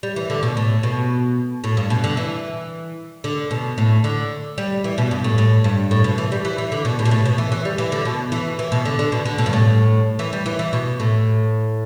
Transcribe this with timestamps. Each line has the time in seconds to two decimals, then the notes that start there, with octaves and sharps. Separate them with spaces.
0.03 G3
0.16 E3
0.30 D3
0.43 B2
0.57 A2
0.83 B2
1.64 A2
1.77 G2
1.90 B2
2.04 D3
2.17 E3
3.24 D3
3.51 B2
3.78 A2
4.04 D3
4.58 G3
4.84 E3
4.98 B2
5.11 G2
5.24 A2
5.38 A2
5.64 G2
5.91 A2
6.04 B2
6.18 E3
6.32 G3
6.45 E3
6.58 E3
6.72 D3
6.85 B2
6.99 A2
7.05 B2
7.11 A2
7.25 B2
7.38 E3
7.52 E3
7.65 G3
7.78 E3
7.92 D3
8.05 B2
8.32 E3
8.59 E3
8.72 B2
8.85 D3
8.99 D3
9.12 B2
9.25 D3
9.38 B2
9.46 G2
9.53 A2
10.19 E3
10.33 G3
10.46 E3
10.59 E3
10.73 B2
11.00 A2